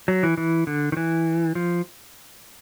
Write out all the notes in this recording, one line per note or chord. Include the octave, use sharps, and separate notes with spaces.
F#3
E3
E3
D3
D#3
E3
F3